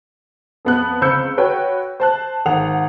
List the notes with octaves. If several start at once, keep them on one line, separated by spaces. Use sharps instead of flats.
F2 B3 F#6
C#2 C4 B5 E6 G6 C#7
F#4 B4 C#5 G5
C5 A5 F#6
G#1 F#5 F7